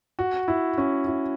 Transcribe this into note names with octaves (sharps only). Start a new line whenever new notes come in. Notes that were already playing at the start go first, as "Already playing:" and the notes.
F#4
E4
C#4
E4